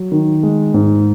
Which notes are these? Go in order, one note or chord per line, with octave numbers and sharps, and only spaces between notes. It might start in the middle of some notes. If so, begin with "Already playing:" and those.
Already playing: F#3
D#3
G#3
G#2